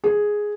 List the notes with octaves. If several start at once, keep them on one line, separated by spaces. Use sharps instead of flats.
G#4